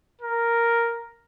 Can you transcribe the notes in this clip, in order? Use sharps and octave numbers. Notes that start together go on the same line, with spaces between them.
A#4